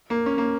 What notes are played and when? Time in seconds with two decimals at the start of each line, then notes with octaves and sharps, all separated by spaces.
0.10 A#3
0.26 C#4
0.38 A#3